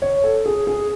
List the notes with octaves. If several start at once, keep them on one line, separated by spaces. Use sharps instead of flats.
C#5
A4
G#4
G#4